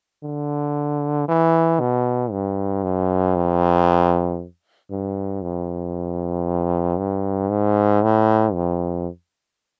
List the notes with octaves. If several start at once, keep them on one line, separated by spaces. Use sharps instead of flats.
D3
E3
B2
G2
F#2
F2
G2
F2
G2
G#2
A2
F2